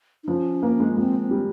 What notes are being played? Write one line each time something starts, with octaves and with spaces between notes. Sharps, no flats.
D#4
F3 C#4
A#3
G#3
G#3 C4
C4
G3